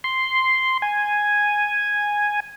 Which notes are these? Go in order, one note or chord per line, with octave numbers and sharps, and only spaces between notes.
C6
G#5